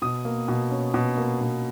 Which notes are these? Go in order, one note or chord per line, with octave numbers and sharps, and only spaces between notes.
B2 D#6
A#3
B2
C#4
B2
A#3
B2